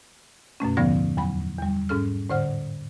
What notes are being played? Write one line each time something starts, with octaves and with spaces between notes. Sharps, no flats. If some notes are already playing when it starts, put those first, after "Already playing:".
F#2 B2 A3 C#4
D#2 A2 D3 F3 B3 A#6
E2 F#3 B5
E2 G3
G#2 C#4 A4 F6
A2 D3 C5 F#5 F6